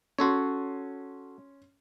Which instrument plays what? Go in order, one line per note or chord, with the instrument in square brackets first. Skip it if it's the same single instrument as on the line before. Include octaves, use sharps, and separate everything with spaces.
[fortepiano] C#4 C6 [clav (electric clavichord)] F#4 A4 C#5